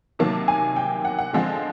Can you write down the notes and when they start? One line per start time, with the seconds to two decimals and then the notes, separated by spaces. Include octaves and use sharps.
0.19 C3 D#3 F#3 A#3 A5
0.48 G#5
0.76 G5
1.05 F#5
1.18 F#5
1.33 D3 F3 G#3 C4